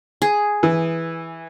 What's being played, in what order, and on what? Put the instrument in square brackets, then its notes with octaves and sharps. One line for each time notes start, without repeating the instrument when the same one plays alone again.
[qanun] G#4
[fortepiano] E3